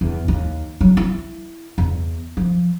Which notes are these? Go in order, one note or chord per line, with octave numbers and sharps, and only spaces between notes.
E2
D#2
F#3
E4
E2
F3